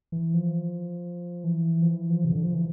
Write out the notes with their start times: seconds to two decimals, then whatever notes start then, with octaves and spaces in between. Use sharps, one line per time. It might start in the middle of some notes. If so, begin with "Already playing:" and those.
0.12 E3
0.34 F3
1.44 E3
1.82 F3
1.89 E3
2.10 F3
2.25 C3
2.32 D3
2.43 F3
2.54 E3